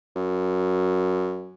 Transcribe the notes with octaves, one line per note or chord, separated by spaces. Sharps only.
F#2